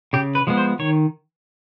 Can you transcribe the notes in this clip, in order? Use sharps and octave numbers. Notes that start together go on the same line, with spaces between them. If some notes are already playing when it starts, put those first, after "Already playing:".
C#3 G4
B4
F3 G#3 B3
C5
D#3 C#5